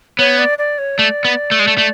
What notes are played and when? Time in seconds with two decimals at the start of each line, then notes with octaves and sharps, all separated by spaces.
0.19 B3 C#5
0.39 D5
0.58 D5
0.79 C#5
0.98 A3 D5
1.25 B3
1.51 A3
1.59 G#3
1.67 A3
1.78 A3